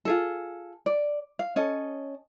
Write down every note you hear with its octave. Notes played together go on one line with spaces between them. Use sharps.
F4 G#4 A4
D5
F5
C#4 A4 D#5